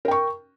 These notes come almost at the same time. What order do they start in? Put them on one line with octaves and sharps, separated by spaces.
A#4 G5 C#6